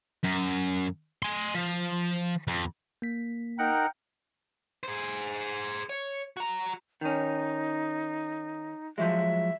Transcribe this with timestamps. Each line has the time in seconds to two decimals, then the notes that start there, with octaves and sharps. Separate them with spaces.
0.23 F#2
1.22 G#5 C6
1.55 F3
2.47 F2
3.02 A#3 B6
3.59 D#4 A#4 F#5 G5
4.83 G#4 C5
5.89 C#5
6.37 F#4 A#5
7.01 D#3 C#4 D#4
8.98 F3 F#3 G#3 E5